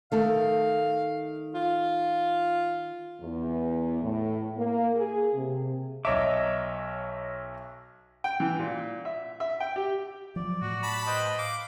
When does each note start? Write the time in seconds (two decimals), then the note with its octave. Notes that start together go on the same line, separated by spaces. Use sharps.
0.12 D#3 A3 A4 F5
1.55 F4
3.21 E2
4.03 A2
4.57 A#3
4.96 G#4
5.34 C3
6.05 B1 C#5 D#5 E5 A#5 D6
8.24 G5
8.40 E3
8.59 A#2
9.05 E5
9.40 E5
9.60 G5
9.76 G4
10.36 F3 F#3 D5
10.62 A2 F#4
10.83 A5 B5
11.07 B4 C5 D#5 G5
11.38 F5 D6